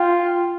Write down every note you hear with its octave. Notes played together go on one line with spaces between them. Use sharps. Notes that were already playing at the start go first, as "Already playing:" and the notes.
Already playing: F4 G5